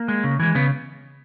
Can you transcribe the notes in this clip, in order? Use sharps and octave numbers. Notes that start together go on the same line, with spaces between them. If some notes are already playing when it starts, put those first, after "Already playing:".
Already playing: A#3
G#3
C#3
E3 G#3
C#3 B3